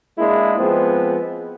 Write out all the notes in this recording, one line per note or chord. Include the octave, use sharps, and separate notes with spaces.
G#3 A#3 D4 E4
F3 G#3 B3 C4